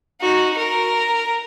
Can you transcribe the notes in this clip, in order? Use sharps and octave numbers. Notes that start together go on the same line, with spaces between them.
D#4 F#4
A#4